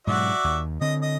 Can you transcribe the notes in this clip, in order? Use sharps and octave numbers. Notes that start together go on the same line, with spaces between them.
G#2 B2 F#3 F#4 D5 E5
D#2
D3 C4 D#5
D#5